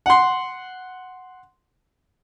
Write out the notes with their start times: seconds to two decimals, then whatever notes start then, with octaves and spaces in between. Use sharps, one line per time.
0.06 F#5 C6